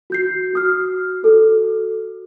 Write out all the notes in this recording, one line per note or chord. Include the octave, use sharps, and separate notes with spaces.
F#4 G6 C7
F#4 D#6 F6
F#4 A4